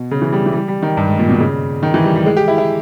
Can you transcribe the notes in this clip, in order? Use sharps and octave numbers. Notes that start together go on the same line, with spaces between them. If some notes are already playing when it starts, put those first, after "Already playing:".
Already playing: B2
C#3
E3
G3
E3
G3
G3
D#3
G2
G#2
A#2
B2
C#3
D#3
E3
G3
G3
G#3
G4
E4
E4